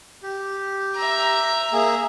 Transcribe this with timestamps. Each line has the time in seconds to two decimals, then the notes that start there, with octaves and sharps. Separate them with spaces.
0.23 G4
0.96 E5 A#5
1.73 A#3 G#4 E5